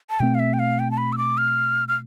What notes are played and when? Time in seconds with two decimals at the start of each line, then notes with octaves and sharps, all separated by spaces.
0.10 A5
0.20 B2 A3 C4 G5
0.35 F5
0.39 E5
0.53 G5
0.59 F5
0.79 G5
0.91 A5
0.97 B5
1.13 E6
1.18 D6
1.38 F6
1.88 F6